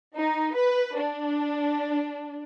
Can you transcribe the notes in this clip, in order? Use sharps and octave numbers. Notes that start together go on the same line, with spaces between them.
D#4
B4
D4